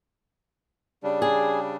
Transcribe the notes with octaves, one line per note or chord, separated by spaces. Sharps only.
C#3 G3 D4
G#4